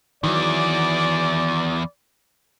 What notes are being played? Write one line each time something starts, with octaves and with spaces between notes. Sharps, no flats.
E2 D#3 E3 F#3 D5